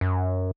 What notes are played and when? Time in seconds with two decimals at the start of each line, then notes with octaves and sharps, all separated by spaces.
0.01 F#2